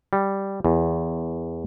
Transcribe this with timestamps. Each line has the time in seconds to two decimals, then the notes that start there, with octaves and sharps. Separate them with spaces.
0.13 G3
0.65 E2